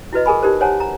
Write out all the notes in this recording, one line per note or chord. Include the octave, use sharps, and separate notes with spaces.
E4 F#4 B4 D#5
G#4 A#4 G#5 B5
D#4 G4 A#4 C5
C5 C#5 F#5 G#5 A5
A#5